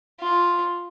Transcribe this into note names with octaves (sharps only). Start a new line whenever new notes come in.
F4